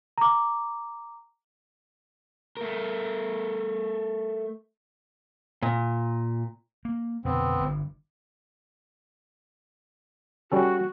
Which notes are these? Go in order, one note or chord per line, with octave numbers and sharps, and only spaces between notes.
A#5 D6
A3 A#4
A#2
A#3
F2 B2 D3 B3 C4
G1 G2
G3 C#4 F#4 A4